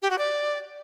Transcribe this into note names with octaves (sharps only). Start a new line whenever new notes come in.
G4
F#4
D5